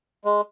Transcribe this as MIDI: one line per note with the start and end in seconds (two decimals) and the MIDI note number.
0.25 0.41 56